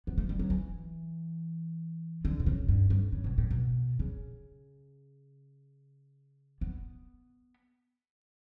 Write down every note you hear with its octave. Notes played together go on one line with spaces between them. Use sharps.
B3
A3
G3
F#3
E3
D3
B2
C#3
G2
G2
C#3
B2
A2
B2
C#3
B3